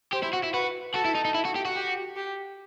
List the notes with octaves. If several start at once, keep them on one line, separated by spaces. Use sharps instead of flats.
G4 C5
E4
F#4
E4
F#4 B4
F#4 A4
E4
D#4
D#4
E4
F#4
G4
F#4
G4
G4